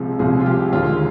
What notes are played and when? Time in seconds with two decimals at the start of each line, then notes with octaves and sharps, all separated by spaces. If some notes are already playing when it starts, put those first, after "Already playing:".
Already playing: C2 C3 F3 G#3
0.19 C2 C3 F3 G#3 G#4
0.40 F4
0.46 G4
0.73 D#2 D3 G#3 F4